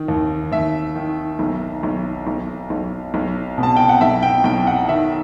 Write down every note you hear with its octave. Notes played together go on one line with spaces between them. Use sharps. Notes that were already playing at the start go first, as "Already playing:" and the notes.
Already playing: D#3
D#2
D#2 E5
D#3
B1
B1
B1
B1
B1
B2
A5
G5
F#5
B1 E5
G5
B1 G5
F#5
D#3 E5